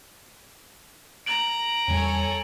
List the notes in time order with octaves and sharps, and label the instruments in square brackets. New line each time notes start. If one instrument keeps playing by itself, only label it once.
[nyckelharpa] A#5 [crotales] D7 F#7
[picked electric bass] E2 G3 [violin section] A4 C#5 G#5